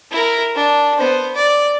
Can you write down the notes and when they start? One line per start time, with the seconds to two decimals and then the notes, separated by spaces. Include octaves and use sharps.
0.11 E4 A#4
0.55 D4
0.98 B3 C5
1.36 D5